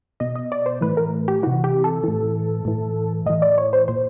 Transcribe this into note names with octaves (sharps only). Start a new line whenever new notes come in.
B2 D#5
D#5
D5
C5
A2 E3 B4
A#4
G4
C3 E3 F#4
G4
A4
A2 E3
A2 E3
A2 E3 D#5
D5
C#5
C5
A#2 C5